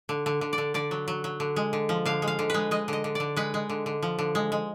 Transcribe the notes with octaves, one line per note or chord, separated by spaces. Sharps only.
D3
D3
D3
D5
D3
D3 D5
F#3
F#3
F#3
D3
G#3
D3
F3
D3 F5
G#3
F5
D3
G#3 B4
G#3 D#5
D3 D#5
D3
D3 D5
G#3 B4
G#3
D3
D3
F3
D3
G#3
G#3